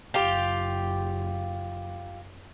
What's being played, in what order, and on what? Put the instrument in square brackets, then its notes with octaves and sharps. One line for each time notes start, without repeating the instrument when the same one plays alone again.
[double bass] F#1 [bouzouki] F4 G4